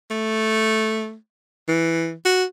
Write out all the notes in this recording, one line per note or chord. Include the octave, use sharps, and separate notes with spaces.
A3
E3
F#4